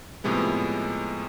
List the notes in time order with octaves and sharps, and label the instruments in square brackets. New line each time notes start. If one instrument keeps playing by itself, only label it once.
[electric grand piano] A2 C3 F3 G#3 B3